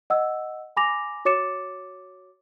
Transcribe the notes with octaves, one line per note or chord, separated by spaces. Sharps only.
D#5 F#5 E6
G#5 B5 D6 A#6 F7
F#4 C#5 D6 A6 C#7 E7